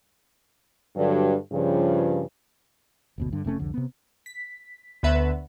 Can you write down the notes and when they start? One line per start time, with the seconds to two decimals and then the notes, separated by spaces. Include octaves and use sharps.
0.96 G2 D3 F#3
1.52 G2 C#3 F3
3.18 F#1 D2 B2
3.32 G2 D3
3.44 F1 C3 A3 C#4
3.59 C2 F2 D3
3.74 C3 B3
4.26 B6
5.03 D2 D3 B3 B4 E5 F#5